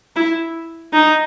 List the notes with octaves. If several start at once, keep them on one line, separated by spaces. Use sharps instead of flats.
E4
D#4